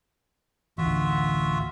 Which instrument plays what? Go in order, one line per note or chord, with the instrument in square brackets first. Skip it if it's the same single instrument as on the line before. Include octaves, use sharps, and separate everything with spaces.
[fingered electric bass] A1 D2 [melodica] F4 F#4 E5